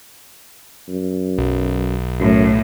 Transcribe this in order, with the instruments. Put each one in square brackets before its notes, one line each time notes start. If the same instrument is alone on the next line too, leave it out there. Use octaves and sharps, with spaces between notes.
[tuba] F#2
[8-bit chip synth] B1
[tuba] F#2 [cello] A2